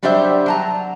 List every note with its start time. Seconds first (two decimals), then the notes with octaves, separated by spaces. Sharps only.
0.03 F#3 G3 D4 G4 C5 E5
0.46 F#3 A5 A#5